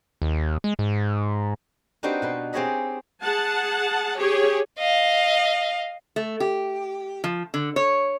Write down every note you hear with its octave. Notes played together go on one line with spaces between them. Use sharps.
D#2
G#3
G#2
C4 D4 D#4 F#4 G4 B4
B2 B4 C6
C4 G4 G#4 C#5 D#5 B5
G#4 F#5 A5
G4 G#4 C#5
D#5 F5
A3
G4
F3
D3
C#5